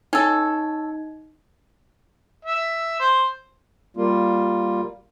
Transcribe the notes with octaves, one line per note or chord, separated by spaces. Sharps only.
C#4 D#4 A4
E5
C5
G3 A#3 F4